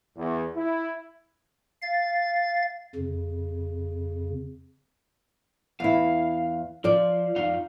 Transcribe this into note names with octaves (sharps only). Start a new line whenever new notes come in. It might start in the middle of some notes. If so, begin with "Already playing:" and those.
E2
E4
F5 A6
F2 C#3
E2 E4 F5
F3 F4 D5
F2 D#4 F5